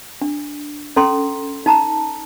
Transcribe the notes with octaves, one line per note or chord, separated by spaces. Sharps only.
D4
C#4 A4 A#5 C6
D#4 A5 A#5